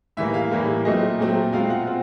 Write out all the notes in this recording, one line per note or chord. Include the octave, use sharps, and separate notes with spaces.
A2 E3 G3 A#3 E5
F5
A2 E3 G3 A#3
A#2 F#3 A3 C4 D#5
A#2 F#3 A3 C4
B2 G#3 C4 F4 F5
F#5
C4 F4